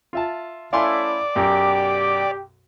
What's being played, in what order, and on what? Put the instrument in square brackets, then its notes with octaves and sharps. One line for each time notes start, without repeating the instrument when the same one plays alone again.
[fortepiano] F4 E5 A5
[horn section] A3 C#4 E4 [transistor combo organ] D5 [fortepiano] F5 G#5 C6
[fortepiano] B1 F#2 B2 [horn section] G4